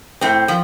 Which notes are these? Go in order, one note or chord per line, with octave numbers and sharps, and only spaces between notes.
A2 C4
F3